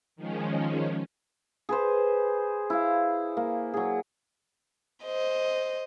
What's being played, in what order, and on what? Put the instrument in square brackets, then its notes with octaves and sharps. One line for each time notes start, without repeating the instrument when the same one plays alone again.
[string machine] D#3 F3 G#3 C#4
[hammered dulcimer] G#4 B4 C5
E4 F5
A#3
F#3 G#4
[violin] C5 D#5